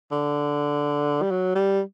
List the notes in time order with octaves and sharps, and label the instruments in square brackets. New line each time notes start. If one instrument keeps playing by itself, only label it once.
[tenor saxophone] D3
G3
F#3
G3